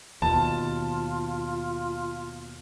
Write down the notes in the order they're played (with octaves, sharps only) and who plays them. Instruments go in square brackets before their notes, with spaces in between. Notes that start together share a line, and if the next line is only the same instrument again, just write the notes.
[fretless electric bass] D#2 B2 [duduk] F4 [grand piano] A5